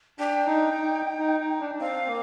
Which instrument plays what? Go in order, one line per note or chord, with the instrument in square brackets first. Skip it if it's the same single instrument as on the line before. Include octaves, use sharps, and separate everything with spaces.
[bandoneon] D4 [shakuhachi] G5
[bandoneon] D#4
D#4
D#4
D#4
D4
D4
[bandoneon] C4 [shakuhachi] F5
[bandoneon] A#3